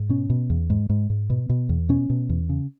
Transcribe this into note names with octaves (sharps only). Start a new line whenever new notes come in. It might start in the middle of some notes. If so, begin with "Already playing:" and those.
Already playing: G#2
B2 C#4
B2
E2
G#2
G#2
G#2
B2 B3
B2
E2
B2 C#4
B2
E2
C#3